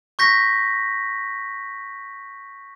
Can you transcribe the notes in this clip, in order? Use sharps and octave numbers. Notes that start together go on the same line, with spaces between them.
C#6 G6 A#6 B6